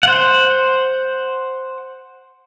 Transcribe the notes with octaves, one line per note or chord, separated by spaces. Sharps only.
C5 F#5